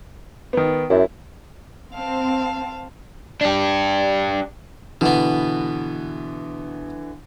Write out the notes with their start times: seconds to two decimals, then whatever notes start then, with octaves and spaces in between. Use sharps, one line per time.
0.53 D#3 B3
0.90 F#2 E4
1.94 C4 F5 A5
3.41 D4 G4
5.01 B2 D3 E3 B3